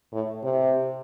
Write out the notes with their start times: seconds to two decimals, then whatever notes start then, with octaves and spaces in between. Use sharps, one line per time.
0.13 A2
0.43 C3